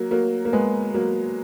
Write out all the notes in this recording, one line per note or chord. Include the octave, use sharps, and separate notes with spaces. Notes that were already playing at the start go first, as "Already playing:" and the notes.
Already playing: F#3 A#3
F#3 A#3
A#3
G#3 B3
F#3 A#3